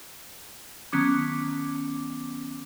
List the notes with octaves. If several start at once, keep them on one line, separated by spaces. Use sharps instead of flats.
D#3 F#3 B3 C#4 D6